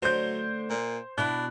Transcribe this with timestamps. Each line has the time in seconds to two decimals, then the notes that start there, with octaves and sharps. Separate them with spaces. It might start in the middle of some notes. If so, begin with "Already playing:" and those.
0.02 D3 F#3 A3 C5 G6
0.70 A#2
1.18 B2 B3 D4 E4 F#6